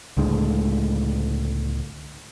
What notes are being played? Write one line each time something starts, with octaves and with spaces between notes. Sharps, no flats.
C#2 A2 D3 G#3